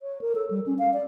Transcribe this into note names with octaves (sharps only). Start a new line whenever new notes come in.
C#5
A#4
A4
G3
C#4
F5
D5